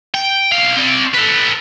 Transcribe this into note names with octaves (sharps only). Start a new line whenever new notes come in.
G5
B1 F5
C4 D5
A4 B4